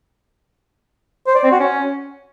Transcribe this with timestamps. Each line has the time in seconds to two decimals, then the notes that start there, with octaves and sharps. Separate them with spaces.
1.27 C5
1.35 D5
1.43 C4
1.52 F#4
1.60 C#4